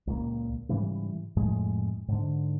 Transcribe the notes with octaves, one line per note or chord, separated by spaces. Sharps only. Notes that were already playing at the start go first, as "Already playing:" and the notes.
C#2 A#2
G#2 C#3 E3 G3
F2 A2 G#3
G#2 D3